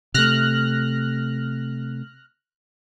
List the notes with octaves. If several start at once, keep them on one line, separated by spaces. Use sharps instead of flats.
C3 A3 F6 F#6 A#6